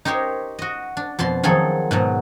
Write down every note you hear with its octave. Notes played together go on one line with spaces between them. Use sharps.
D#4 G4 A#4 C5 C#5
F#4 D#5
D4
F2 B2 A5 C6
D#3 F3 F#3 G#4 A4
G#2 B2 F#3